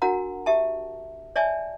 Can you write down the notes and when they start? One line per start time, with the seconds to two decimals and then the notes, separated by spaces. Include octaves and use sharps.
0.02 D4 F#4 A#4 F#5 A#5
0.46 G4 E5 A5
1.36 C#5 D5 E5 G#5 A5